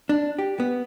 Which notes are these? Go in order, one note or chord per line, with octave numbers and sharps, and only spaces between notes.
D4
G4
B3